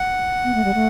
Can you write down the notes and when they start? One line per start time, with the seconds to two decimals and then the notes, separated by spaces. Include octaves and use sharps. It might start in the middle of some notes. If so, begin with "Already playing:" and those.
Already playing: F#5
0.44 B3
0.55 A3
0.64 G3
0.74 A3